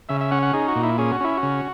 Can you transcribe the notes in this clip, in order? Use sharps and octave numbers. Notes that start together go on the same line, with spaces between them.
C#3 E5
E5
C#4 F#5
F#5
D#4 G#4
F#4
A#2
E4
C#4 G#4
F#4
C#4 E4
F#4
C#3